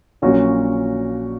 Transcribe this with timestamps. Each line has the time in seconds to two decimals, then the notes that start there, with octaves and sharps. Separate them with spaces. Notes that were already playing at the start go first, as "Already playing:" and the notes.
0.22 A#1 A#2 F#3 C#4 F#4